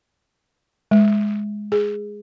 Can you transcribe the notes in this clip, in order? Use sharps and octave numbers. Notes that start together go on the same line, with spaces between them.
G#3
G#4